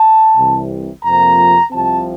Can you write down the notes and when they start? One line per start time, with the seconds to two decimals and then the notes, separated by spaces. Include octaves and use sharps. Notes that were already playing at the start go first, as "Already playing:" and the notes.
Already playing: A5
0.36 C2 C3 E3
1.03 F2 C3 F3 A#3 A#5
1.71 C2 C3 F3 C4 A5